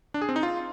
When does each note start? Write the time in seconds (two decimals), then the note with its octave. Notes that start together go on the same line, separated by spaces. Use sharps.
0.14 D4
0.22 G#4
0.29 C4
0.36 D#4
0.43 F4